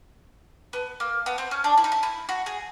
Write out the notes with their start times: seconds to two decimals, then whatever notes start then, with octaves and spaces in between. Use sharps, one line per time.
0.73 B3
1.00 A#3
1.26 B3
1.38 C4
1.51 C#4
1.64 D4
1.78 E4
1.84 D#4
1.92 E4
2.03 E4
2.29 F#4
2.46 G#4